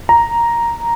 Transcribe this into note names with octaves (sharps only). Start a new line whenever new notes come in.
A#5